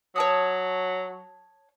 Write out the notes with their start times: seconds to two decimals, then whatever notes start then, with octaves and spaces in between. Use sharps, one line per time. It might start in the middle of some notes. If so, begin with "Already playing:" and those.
0.16 F#3 C#5 A5 D#6